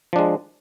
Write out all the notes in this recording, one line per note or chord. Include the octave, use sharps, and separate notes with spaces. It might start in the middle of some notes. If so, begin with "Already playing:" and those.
F3 G#3 D4